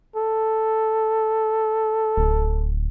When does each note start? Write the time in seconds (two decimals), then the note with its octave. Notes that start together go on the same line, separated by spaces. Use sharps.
0.16 A4
2.17 D1